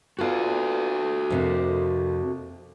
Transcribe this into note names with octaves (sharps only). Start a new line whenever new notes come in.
B3 F4 F#4 A4 D5
F2 C3 A#3